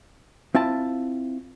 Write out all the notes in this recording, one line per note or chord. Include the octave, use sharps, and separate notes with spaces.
C4 E4 F4 A5